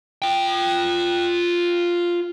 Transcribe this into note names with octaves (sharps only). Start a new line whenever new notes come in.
F4 G5